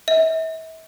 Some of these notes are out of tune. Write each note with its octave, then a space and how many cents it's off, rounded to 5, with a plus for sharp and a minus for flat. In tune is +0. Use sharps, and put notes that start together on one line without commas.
E5 -40